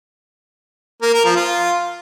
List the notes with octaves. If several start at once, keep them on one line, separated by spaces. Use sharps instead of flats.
A#3
A#4
F3
F4